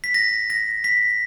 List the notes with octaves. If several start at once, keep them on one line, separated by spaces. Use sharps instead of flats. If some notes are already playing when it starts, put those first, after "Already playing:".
B6
A#6
A#6
B6